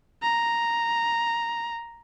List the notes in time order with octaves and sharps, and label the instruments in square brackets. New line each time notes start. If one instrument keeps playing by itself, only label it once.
[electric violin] A#5